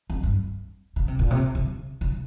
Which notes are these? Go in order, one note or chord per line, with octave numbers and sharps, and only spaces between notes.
F2
G2
C#3
C3
A#2
C3
C#3
C#3